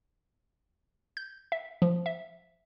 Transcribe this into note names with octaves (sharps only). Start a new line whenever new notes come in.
G6
E5
F3
E5